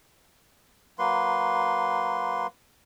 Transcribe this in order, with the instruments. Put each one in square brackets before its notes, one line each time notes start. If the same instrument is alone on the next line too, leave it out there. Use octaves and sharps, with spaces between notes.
[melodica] F#3 A#3 B4 C6